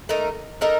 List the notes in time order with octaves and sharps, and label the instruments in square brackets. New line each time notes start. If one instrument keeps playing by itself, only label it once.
[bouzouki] A3 D#4 A#4
A3 D#4 A#4